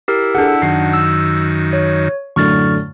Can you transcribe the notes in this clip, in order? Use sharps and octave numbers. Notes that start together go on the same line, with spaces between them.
E4 G4 A#4
D4 G#4 A4 F#5
F#2 D#3 C7
E6
C#5
F#2 A2 D3 C#6 F6 A6